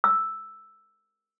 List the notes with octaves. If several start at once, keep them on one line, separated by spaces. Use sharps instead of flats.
E6